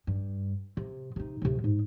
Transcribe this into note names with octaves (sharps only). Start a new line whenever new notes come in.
G2
C3
C3 D#4
D2 C3
G#2